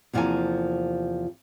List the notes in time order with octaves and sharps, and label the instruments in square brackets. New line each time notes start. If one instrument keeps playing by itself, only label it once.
[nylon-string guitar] E2 C3 F3 A#3 A4 G#5